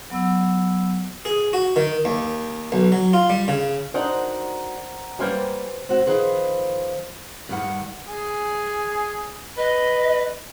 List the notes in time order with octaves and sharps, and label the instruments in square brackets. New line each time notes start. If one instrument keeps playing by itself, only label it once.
[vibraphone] F#3 B3 F#5 E6
[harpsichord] G#4
F#4
D#3
D#2
B1
F#3
F4
G3
C#3
[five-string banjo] D4 D#4 F#4 [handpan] A#4 C5 [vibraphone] D5 F#5 A#5
[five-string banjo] G3 A#3 C#4 [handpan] G4 B4 C5
[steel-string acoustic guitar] C4 F#4
D#3 F3 G#4 B4 C5
G2 D#3 G3 F#5
[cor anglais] G#4
[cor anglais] B4 [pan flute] D#5